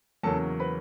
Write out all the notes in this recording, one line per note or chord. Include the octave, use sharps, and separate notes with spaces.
E2 C#3 F#3 A#3 C#4 A4 A5
B4 B5